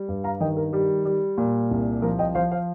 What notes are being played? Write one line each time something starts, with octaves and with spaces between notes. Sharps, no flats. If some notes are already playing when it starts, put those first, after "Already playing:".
Already playing: G3
G2
F5 A#5
D#3 D#5 G5
A#4
G3 G4
G3
A#2
C2
F3 A#4
D#5 G5
F3 C5 F5
C5 F5